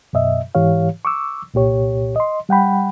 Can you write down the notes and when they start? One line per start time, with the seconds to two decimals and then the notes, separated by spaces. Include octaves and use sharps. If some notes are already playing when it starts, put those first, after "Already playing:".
0.13 F#2 B2 D#5 E5
0.55 G#2 E3 G4 C#5 F5
1.05 C#6 D6 E6
1.54 C2 A#2 G4 C#5
2.16 D#5 C6
2.49 G3 F#5 G5 B5